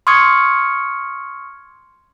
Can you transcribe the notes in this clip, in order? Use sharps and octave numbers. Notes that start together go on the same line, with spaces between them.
C6 C#6 D#6 F6 G#6 C#7